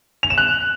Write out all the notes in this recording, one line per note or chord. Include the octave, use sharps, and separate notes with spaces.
F7
E7
F#6